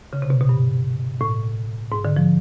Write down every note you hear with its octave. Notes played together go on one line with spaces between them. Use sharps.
C#3
C3
B2
B2
G2
A2
G#2
D3
F3